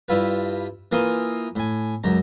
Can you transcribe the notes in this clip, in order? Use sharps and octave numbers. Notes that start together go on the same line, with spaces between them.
G2 E4 F4 B4
E3 A#3 F4 A#4 C6 D#6
A2 G#5
C#2 F#2 A#5